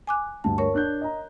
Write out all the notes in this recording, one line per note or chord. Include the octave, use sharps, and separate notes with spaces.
G#5 D6 F#6
D2 G2 A5
A#4 C#5 C#6
D4 F#6 G6
D#5 A#5